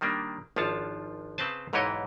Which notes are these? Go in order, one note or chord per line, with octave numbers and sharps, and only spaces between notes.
D#3 G3 A#3 D4
G#1 F3 D4 F4 C#5 A5
C#3 C4 B4 C5 A5
B1 G#2 E3 G4 C#5 D#5